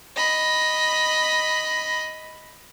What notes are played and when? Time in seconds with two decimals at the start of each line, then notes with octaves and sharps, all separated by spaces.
0.16 D#5 B5